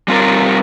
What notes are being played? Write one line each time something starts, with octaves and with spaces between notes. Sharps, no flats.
G3 C4 F4 A#4